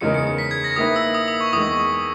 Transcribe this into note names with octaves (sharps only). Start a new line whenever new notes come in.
E2 C#3 G#3 D#4 A#4 C#7
C#7
C#7
B6
G#6
A#6
D#3 A#3 E4 B4 D#6
E6
D#6
D#6
C#6
E2 D#3 G#3 D#6